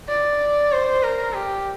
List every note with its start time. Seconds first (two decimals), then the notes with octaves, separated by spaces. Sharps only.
0.09 D5
0.72 C5
1.03 A#4
1.35 G4